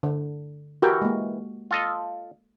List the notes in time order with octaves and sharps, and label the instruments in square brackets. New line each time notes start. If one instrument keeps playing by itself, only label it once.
[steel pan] D3
[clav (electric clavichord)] E3 G5 [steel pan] F#4 G4 A#4
[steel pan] G#3 A#3
[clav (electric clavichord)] F4 A4 D#5